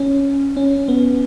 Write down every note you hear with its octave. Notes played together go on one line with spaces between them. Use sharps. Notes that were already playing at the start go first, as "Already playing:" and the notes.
Already playing: C#4
C#4
B3